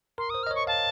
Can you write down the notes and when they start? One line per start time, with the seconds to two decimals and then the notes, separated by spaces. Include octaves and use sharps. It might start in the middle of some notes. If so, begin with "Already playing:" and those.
0.18 A#4 C6
0.30 C5 D#6
0.43 D#5 F6
0.51 C#5 C#6
0.67 F5 A5